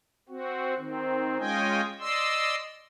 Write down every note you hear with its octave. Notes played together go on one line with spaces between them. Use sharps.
C4 F#4
D#3 C4
G#3 C#4 F4 D#5 G5 G#5
D5 D#5 C6 E6